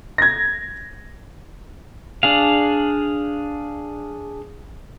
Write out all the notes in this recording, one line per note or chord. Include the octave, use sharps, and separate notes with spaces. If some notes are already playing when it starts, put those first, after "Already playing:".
G#6 A#6
D4 G#4 F5